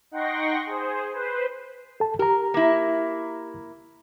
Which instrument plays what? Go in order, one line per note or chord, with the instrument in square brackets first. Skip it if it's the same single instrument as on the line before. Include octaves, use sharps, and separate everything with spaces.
[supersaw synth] D#4 F#5 G5 C6 C#6 A#6
G#4 C5
B4 C5
[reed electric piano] A4 A5
[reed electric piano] G4 A#5 [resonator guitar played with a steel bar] A#4
[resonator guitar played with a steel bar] A#3 E4